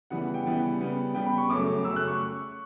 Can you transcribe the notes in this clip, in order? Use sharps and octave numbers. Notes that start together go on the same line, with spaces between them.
C#3 E3 G3 B3 F#5
F#5
G5
C#3 E3 G3 B3
C#3 G3 B3
C#3 G3 B3 G5
B5
C#6
F#2 C#3 F#3 A3 D6
F#2 C#3 F#3 A3 E6
F#6
C#6